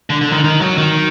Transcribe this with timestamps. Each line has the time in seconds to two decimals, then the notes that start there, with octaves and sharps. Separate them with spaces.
0.10 D3
0.21 D3
0.32 D#3
0.44 D#3
0.61 F#3
0.78 D#3